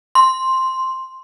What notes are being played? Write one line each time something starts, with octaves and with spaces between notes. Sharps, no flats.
C6